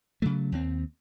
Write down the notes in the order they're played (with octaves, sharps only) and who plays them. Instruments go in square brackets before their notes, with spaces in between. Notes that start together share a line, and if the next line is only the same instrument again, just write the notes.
[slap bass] C#3 F#3 A3
D#2 C4